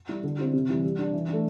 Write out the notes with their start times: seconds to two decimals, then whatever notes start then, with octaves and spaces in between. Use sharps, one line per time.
0.09 G3 E4 G4
0.24 D3
0.38 C4 E4 G4
0.53 C3
0.69 E3 G3 E4 G4
0.84 G3
0.99 D4 G4
1.13 E3
1.29 A3 D4